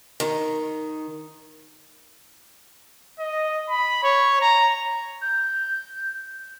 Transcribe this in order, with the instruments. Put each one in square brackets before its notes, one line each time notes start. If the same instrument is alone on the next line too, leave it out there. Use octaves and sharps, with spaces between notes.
[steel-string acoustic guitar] D#3
[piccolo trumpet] D#5
B5
C#5
A#5
[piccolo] G6